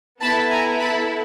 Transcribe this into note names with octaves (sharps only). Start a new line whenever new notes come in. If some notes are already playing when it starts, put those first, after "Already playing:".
B3 E4 A4 A5 B5
G#5 A#5
A5 B5